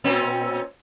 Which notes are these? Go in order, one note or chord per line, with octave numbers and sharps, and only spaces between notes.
A#2 C4 C#4